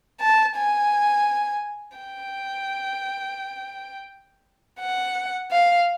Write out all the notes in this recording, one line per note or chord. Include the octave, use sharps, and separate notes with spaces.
A5
G#5
G5
F#5
F5